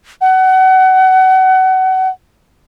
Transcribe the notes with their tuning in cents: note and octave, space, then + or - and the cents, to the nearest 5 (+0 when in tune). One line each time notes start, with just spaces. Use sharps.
F#5 +25